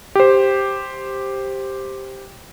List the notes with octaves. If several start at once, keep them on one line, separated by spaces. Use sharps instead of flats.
G4 C5